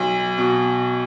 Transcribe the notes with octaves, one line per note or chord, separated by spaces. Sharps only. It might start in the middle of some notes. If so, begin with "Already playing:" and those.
Already playing: B1
B2